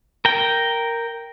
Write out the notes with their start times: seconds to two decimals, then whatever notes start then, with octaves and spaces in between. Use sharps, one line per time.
0.25 A#4 G5